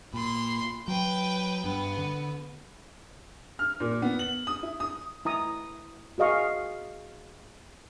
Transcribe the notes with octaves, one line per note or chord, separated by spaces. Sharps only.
A#2 B5 C6
F#3 B4 G5
G2 B3
D3
F6
A#2
B3
F#7
D#6
E4
D#6
E4 A#5 D#6
F#4 G#4 D#5 F5 C#6